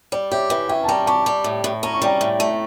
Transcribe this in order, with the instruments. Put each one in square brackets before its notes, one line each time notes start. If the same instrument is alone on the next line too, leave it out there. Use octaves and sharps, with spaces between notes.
[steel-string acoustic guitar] G3 [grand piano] D5
[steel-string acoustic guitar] G4 [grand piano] C#5 E5
[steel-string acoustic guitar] E3 [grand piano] E5 G5
[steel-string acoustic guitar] C#4 [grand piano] E5 G5
[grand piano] A5
[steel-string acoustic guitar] G3 [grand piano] G5 A#5
[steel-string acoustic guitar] G4 [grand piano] A5 C#6
[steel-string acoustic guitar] G3
A2
A2
[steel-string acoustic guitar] C#4 [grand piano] A#5
[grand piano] C#6
[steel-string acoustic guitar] G3 [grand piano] G5 A#5
[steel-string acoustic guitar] A2
A3